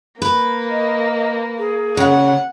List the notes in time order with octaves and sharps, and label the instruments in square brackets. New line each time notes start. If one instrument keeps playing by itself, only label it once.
[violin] A#3 [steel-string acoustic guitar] B4
[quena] D#5
G#4
[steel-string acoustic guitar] C#3 [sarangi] F#5